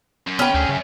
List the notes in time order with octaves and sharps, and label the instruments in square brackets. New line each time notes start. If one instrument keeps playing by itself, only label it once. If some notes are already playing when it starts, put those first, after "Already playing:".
[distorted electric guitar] F#2
[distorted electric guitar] D3 B4 [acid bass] B3 [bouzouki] C#4 G5
[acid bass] D2 [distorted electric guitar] C4 G#4
[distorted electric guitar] F#2 [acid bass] C#3